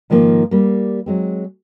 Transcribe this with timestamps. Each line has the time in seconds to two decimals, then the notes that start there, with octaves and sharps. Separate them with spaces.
0.10 G#2 D#3 F3 A#3
0.51 G3 A#3
1.06 F#3 G#3 C4